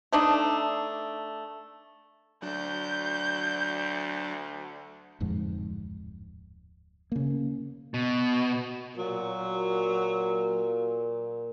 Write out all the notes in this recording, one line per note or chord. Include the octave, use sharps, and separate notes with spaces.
A3 D4 D#4
D2 F#3 D4 G6
D1 F2 G#2
C#3 A#3
B2
A#2 F#3